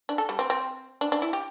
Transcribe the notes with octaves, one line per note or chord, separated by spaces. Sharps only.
D4
A4
G3
C4
C4
D4
D4
E4
G4